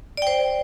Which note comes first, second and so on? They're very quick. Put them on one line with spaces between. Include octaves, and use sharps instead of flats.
D5 G5 C5